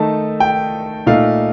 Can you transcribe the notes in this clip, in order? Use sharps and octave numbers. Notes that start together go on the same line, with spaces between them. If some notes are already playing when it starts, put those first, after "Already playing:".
Already playing: D#3 A3 D#4 A5
G5
A#2 A3 D#4 F5